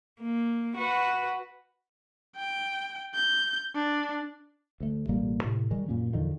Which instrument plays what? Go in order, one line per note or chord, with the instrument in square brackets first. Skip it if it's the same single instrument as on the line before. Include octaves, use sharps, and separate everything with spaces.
[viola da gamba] A#3
F#4 B4
[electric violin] G5
G6
D4
[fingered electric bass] D2 A3
A1 B2 G3 A#3
A2 C3
D#3 G3 G#3
F#2 A#2 A#3 C#4
E2 D3 D#3 F3